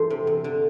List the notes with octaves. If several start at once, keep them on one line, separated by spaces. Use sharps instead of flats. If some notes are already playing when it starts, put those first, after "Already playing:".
Already playing: E2 G2 A4 C5
C3
E2
D3